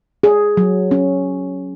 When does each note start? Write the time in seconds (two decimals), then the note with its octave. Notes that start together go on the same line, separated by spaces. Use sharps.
0.23 G#4
0.57 F#3
0.91 C#4